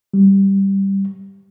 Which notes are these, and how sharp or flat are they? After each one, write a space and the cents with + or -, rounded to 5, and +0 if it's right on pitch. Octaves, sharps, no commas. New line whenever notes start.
G3 -5